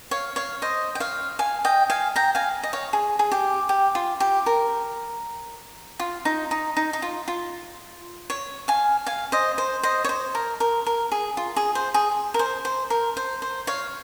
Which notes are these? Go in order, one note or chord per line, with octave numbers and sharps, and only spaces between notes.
C#5 F5
C#5 F5
C5 D#5
G5
C#5 F5
F5 G#5
D#5 G5
F5 G#5
G5 A#5
F5 G#5
D#5
C#5 F5
G#4
G#4
G4
G4
F4
G4
A#4
F4
D#4
D#4
D#4
D#4
F4
F4
C#5
F5 G#5
F5 G#5
C5 D#5
C5
C5 D#5
C#5
C5
A#4
A#4
A#4
G#4
F4
G#4
C5
G#4
A#4
C5
C5
A#4
C5
C5
C#5 F5